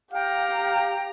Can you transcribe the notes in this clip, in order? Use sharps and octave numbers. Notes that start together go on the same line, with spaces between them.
G4 F5 G5 A#5